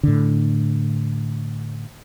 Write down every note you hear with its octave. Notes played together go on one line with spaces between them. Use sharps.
A2 D3